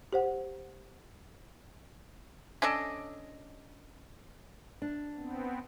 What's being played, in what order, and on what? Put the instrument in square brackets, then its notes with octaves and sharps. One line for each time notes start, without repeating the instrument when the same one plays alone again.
[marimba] G4 C5 F#5
[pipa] C#4 D4 A4 D#5
[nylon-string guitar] D4
[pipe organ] B3 C4